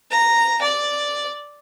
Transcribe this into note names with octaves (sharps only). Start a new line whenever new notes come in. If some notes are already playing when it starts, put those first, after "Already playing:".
A#5
D5